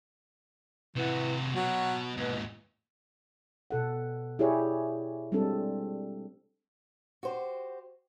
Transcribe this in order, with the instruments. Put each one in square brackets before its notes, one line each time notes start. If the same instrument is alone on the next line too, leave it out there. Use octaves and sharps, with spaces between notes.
[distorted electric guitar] C3 F#4 [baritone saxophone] E3
[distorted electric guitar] B2 [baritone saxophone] F#3
[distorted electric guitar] D#2 G#2 [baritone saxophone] B2
[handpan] B2 A4 F#5
E4 G4 G#4 C#5 D5
G3 G#3 C4 D4 A4
[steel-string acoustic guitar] F#4 G4 C5